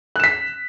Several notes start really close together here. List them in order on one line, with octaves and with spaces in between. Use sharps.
F#6 E7 B6